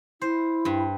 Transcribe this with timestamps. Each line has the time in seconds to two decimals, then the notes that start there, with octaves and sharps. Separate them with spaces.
0.22 E4 C5
0.65 G2